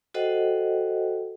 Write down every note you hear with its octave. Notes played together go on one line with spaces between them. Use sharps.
F#4 A4 C5 D#5 F#5 G5